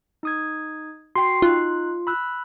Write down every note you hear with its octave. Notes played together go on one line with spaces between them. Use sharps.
D#4 D#6 G#6
F#4 G5 C6 C7
D#4 F4 F#6
B5 E6 F#6